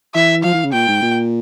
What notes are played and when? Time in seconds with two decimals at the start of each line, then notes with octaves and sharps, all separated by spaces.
0.14 E3 E5
0.44 F3 F5
0.54 E3
0.64 C#3
0.73 A#2 G5
0.88 G#2
1.02 A#2